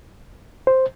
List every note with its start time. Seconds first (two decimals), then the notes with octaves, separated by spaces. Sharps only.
0.67 C5